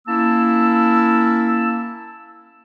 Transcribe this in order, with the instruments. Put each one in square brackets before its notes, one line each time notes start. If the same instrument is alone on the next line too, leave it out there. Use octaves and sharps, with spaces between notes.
[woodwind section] A#3 C#4 E4 A5 E6